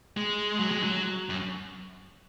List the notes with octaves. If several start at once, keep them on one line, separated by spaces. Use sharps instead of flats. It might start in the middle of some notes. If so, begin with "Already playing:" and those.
G#3
F#3
G#3
F#3
F#2